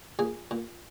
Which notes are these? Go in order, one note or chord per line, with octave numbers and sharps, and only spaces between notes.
A#2 G#4
A#2